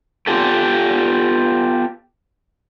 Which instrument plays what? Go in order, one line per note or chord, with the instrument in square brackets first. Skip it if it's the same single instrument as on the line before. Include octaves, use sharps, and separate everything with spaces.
[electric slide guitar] B3 F4 G4 A4